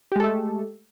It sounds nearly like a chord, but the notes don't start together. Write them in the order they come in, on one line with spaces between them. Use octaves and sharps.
G4 G#3 A4 A3